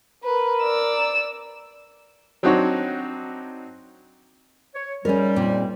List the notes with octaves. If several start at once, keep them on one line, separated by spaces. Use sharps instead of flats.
A#4 B4
D5 E6
F#3 C4 D4 D#4 F#4 C#5
C#5
G#2 G3 C#4 A#4
A#2 C4